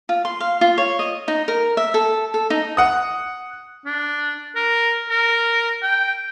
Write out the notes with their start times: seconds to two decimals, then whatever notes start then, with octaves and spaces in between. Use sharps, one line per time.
0.09 F4
0.25 C6
0.40 F5
0.61 F4
0.78 C#5
0.99 D#5
1.28 D#4
1.48 A#4
1.77 E5
1.94 A4
2.34 A4
2.50 D#4
2.77 F#5 D#6
3.85 D4
4.56 A#4
5.10 A#4
5.83 G5